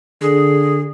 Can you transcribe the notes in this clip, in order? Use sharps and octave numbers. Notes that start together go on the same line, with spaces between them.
D3 G#4